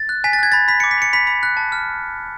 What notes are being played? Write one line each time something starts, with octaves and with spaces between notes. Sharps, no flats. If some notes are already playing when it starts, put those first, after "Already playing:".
Already playing: A6
F#6
G#5 B6
A6
F#6 G#6
B5 A6
B5 B6
D6 C#7
B6
B5 C#7
B5 B6
B5
F#6
A5
F6